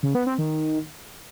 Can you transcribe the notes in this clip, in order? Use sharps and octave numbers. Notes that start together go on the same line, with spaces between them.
C#3
B3
C4
D#3